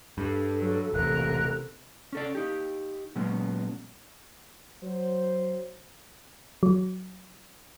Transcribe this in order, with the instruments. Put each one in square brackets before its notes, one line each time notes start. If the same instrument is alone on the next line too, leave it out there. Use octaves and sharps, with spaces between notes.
[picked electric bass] G2 [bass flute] A4
[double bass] F#3
[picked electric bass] E1 A1 [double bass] C3 [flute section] A#4 F#6
[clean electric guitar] C#4 A4 D5
D#4 G4
A#2 F#3 G#3 B3 C#4
[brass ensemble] F#3 [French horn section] C5
[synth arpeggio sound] F#3